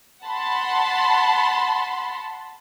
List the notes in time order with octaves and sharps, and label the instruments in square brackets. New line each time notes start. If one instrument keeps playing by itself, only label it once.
[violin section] F#5 A5 B5 C6